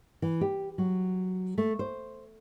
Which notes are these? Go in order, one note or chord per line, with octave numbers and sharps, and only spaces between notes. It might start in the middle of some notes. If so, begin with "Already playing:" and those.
E3
G4
F#3
A3
C5